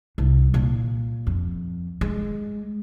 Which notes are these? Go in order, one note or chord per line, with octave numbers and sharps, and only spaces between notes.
C2
A#2
F2
G#3